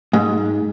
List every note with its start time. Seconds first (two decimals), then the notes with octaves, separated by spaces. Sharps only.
0.13 G#2